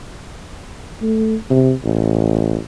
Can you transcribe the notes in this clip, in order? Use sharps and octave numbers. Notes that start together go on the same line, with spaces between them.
A3
C3
A1